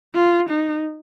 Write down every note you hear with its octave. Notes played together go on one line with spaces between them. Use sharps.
F4
D#4